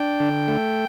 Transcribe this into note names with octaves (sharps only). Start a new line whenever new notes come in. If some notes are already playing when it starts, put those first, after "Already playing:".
Already playing: D4 G5
D3
A3